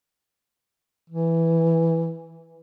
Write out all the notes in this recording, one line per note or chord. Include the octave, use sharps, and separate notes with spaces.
E3